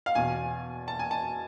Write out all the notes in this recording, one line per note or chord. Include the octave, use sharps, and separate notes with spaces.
F5
E2 B2 G#5
A5
G#5
A5